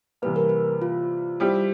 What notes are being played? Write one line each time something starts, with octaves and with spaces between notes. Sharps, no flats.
C3 E3 G3 A#3 B4
A#4
B4
F4
G3 C4 E4 G4